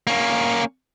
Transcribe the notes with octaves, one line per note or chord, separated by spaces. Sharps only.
A#3 C#4